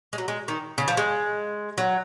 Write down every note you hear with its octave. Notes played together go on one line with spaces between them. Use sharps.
G#3
F#3
G#3
D#3
C#3
F3
G#3
F#3